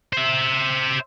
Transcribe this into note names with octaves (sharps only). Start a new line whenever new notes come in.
C5 E5